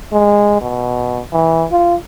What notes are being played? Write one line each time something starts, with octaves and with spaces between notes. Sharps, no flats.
G#3
B2
E3
F4